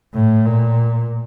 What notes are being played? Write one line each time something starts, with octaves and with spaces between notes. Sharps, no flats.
A2
A#2